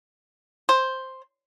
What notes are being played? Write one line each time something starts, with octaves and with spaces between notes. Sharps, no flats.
C5